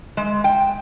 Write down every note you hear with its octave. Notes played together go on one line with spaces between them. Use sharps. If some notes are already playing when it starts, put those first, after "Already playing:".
G#3
G5